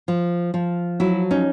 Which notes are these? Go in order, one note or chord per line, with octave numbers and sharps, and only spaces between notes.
F3
F3
F#3 E4 F#4
C#4 D#4